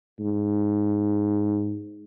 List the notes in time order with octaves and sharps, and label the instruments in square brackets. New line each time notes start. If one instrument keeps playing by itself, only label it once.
[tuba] G#2